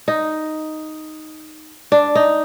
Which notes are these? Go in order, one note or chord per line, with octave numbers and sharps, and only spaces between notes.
D#4
D4
D#4